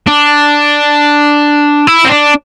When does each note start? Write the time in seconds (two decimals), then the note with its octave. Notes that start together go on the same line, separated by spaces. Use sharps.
0.07 D4
1.87 E4
2.05 C4
2.09 D4